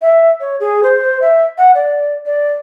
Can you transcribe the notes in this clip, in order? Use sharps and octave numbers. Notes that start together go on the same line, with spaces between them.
E5
C#5
G#4
C5
E5
F#5
D5
D5